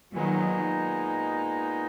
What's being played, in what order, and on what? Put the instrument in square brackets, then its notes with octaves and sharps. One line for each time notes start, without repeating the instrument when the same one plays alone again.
[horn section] A#2 G#3 B3 D#4 [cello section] D#3 F#3